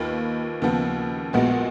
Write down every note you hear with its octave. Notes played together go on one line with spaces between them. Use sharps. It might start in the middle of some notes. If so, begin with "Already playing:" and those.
Already playing: D#2 D#3 A#3 F4 B4
D#2 C#3 F3 B3
A#1 A#2 G#3 B3 F#4